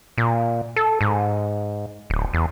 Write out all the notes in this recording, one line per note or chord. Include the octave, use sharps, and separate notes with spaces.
A#2
A4
G#2
D1
E2